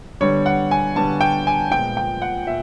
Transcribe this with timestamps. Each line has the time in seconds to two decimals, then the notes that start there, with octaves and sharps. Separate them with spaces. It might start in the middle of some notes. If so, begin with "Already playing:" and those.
0.21 D3 G3 B3 C#5
0.46 F#5
0.71 G#5
0.96 D3 G3 B3 A5
1.21 G5
1.47 G#5
1.71 A#2 F3 G#3 B3 G5
1.97 G5
2.22 F#5
2.47 A#2 E5